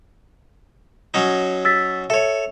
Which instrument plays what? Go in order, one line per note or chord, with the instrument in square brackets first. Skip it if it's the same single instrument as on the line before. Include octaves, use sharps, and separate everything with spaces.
[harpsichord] F#3 C#4 D#4
[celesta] E6 A6 B6
[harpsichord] A4 C#5 [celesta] E5